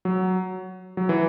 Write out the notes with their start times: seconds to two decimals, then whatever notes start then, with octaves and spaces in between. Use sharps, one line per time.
0.05 F#3
0.97 F#3
1.09 E3